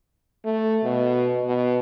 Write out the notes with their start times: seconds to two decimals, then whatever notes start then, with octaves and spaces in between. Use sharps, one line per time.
0.45 A3
0.84 B2
1.46 B2